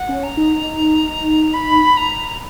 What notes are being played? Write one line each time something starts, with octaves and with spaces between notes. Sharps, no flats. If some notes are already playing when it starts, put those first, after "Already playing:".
Already playing: F#5
C#4
A#5
D#4
B5
A#5